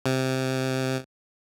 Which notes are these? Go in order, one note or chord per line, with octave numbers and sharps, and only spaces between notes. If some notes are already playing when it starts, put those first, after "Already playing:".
C3